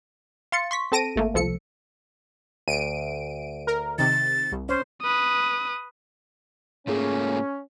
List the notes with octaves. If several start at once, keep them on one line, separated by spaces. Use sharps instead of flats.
F5 C6 A6 C#7
C6 C#6 B6
C4 A4 A5 A#6 D7 D#7
G#1 A3 A#3
C2 F3 A4 C#7
D2 D7 D#7
A#4
C3 D#3 A6
C2
C#4 C5
B4 D#6
G#2 A3 A#3 C#4 F4 G#4